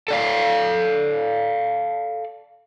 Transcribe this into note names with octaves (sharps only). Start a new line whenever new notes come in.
A4 D5 F5